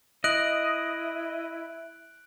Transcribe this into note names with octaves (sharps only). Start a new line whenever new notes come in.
E4 D#5 F#6 D7 F#7